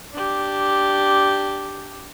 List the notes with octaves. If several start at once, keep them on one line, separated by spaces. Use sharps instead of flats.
D4 G4